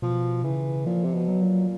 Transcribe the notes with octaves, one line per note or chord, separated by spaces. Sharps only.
B2 F3
C#3 E3
A#2 F3
C3
B2
F#3
A#2